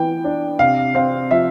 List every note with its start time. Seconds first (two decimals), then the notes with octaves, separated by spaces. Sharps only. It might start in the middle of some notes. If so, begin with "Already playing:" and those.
Already playing: E3 B3 G5
0.24 D4
0.59 C3 F5
0.95 C4 F5
1.31 F3 E5